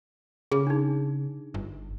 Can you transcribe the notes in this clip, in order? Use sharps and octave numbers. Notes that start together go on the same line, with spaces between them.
C#3 G#4
D4 D#4
G1